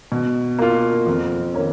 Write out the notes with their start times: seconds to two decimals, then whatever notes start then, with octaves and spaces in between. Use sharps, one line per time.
0.12 B2
0.59 A#3 F4
1.06 F2
1.54 D#3 A#3 C#4